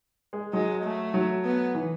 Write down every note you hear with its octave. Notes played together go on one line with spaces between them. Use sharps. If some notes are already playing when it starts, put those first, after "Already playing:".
G#3
F#3 G#3
A3
F#3
B3
E3